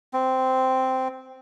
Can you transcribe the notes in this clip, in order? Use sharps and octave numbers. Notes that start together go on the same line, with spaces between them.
C4